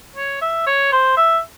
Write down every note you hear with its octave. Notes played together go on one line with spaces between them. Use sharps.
C#5
E5
C#5
C5
E5